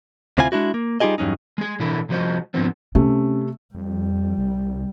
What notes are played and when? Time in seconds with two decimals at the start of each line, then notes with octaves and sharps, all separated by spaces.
0.38 D2 C3 C4 E4 F4 G#5
0.52 G#3 D4 E4 F#4
0.74 A#3
1.00 G3 D#4 F4 G4 G#4 D#5
1.18 E2 G2 F#3 C#4 D#4
1.58 G#3 G#4
1.79 B2 D3 E3 E4 A4 A#4
2.09 C2 F3 F#4 C5 D#5
2.54 D2 G#2 D3 F3 B3 C4
2.95 C3 A3 C#4
3.75 F2 G3
4.38 C2